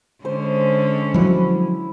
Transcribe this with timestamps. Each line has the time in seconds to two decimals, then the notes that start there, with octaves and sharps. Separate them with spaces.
0.25 D3 G#3 C#4 C5
1.14 F3 F#3 E4